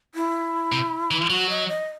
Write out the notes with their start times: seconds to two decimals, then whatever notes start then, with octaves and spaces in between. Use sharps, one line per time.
0.15 E4
0.72 C3
1.11 E3
1.30 F#3 F#4
1.49 D#5
1.68 D#5